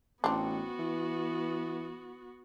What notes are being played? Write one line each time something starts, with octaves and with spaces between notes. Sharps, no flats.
A1 B3 C4 D4 F#4
E3